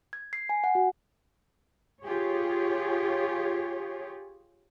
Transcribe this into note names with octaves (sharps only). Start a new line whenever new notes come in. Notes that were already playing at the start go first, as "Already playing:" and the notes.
G#6
C7
G#5
F#5
F#4
F4 G4 G#4 C#5